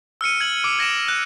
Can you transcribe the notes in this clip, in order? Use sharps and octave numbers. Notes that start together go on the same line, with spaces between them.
E6 F6 C#7 D#7
G#6 F#7
D6 E6 D7
G#6 A#6 D7 E7
F#6